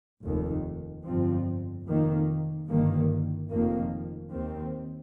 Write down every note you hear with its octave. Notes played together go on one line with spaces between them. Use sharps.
F1 D#2 D#3
G1 F2 F3 C4
F1 F2 D#3 A#3
G1 G2 D#3 A#3
F1 F2 D#3 A#3
D#2 D#3 C4